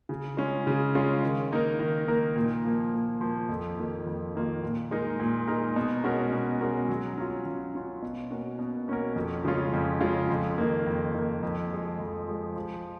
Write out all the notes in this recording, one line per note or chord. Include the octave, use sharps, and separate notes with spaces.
C#3
G#3 C#4 F4
C#3
G#3 C#4 F4
D#3
A#3 D#4 A#4
D#3
A#3 D#4 A#4
A#2
F3 A#3
A#2
F3 A#3
F2
D#3 A#3 F4
F2
D#3 A#3 F4
A#2
G#3 D#4 A#4
A#2
G#3 D#4 A#4
B2
G#3 C#4 F#4 A#4
B2
G#3 C#4 F#4 A#4
F#3
C#4 F4
F#3
C#4 F4
B2
A#3 C#4 F#4 A#4
B2
A#3 C#4 F#4 A#4
F2
C#3 G#3 C#4 F4
F2
C#3 G#3 C#4 F4
F2
D#3 A#3
F2
D#3 A#3
F2
F3 G#3
F2
F3 G#3
F3